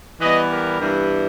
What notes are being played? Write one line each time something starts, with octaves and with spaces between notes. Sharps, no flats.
E3 G3 B3 B4 D#5
G4 A#4
G2 E3 G3 B3 E4